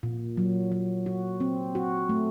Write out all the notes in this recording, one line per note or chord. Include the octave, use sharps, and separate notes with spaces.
A#2
F#3
F#3
F#4
C4
F#4
A3